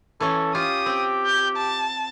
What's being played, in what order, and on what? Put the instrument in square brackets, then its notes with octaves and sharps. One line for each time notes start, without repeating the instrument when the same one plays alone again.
[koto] E3 C#4 [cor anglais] A4
[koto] F4 [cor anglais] G4 [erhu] D#6
[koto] C4 G5
[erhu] G6
A5